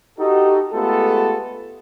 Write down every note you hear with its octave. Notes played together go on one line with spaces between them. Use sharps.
D#4 F#4 G4 A4
G#3 A3 B3 F4 G4 A4